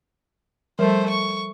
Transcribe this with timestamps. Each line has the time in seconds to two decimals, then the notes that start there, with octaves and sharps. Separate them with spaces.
0.79 F3 G3 A3 A#4 C5
1.09 C#6